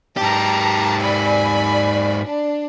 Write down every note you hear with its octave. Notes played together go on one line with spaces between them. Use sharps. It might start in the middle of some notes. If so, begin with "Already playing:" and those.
G#2 G4 A5 A#5
D5 G#5 B5
D4